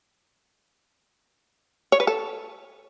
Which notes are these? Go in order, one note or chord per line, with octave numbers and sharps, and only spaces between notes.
C#5
B4
A4